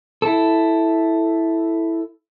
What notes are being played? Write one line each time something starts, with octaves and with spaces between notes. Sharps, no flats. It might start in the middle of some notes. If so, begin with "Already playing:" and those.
E4 A4